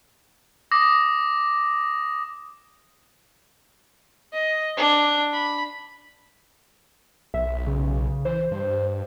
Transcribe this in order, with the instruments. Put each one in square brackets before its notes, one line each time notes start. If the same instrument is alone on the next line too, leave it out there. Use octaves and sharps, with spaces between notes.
[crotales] D6 D#6 A#6
[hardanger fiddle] D#5
D4
B5
[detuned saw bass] B1 [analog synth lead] E5
[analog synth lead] C#3
[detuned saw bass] E3 [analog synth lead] C5
[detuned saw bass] G2